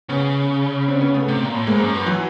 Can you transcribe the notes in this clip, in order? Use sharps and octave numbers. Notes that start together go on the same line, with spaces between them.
C#3 B3 C#4
C4 D4
B3 C#4
A3 B3
C3
A#2
A2
G#2 G#3 A#3
F#2
G2
E3 F#3